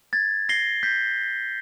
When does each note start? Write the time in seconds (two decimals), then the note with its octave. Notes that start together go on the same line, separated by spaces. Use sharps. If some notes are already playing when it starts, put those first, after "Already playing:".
0.13 G#6 A6
0.49 A#6 C7 G7
0.83 G6 B6